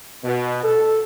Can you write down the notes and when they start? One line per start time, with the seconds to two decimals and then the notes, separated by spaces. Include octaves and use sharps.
0.24 B2
0.64 A4